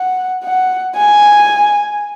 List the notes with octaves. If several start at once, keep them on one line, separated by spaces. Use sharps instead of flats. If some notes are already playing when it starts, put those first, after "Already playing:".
Already playing: F#5
F#5
G#5